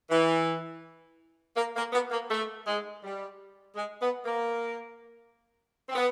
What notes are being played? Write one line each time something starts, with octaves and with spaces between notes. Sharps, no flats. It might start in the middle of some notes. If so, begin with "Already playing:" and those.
E3
A#3
A#3
B3
A#3
A3
G#3
G3
G#3
B3
A#3
C4
B3